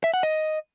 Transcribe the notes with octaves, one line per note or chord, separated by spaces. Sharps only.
E5
F#5
D#5